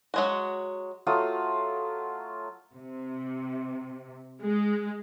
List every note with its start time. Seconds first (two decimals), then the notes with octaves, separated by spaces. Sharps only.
0.14 F#3 G#3 F#4
1.07 F#3 A3 F4 D#6
2.76 C3
4.43 G#3